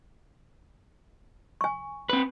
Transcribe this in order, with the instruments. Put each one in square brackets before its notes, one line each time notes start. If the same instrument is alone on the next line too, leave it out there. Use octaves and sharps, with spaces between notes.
[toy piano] G#5 C#6
[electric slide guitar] C4 B4